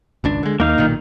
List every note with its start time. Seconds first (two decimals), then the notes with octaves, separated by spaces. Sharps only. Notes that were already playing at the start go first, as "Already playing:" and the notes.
0.24 G#1 C#2 D4
0.43 D3 G#3
0.60 D#2 A#3 D#4 F5
0.78 B1 A#2 D#3